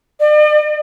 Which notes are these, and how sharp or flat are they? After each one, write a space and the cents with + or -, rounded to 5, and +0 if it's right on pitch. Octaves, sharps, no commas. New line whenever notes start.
D5 +40